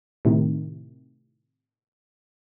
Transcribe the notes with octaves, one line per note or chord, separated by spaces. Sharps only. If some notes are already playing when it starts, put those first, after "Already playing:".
A2 C3 D#3